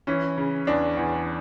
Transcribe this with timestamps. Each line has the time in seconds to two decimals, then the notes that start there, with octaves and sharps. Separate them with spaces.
0.07 E3 C#4
0.37 C#3
0.67 E2 D4
0.97 E2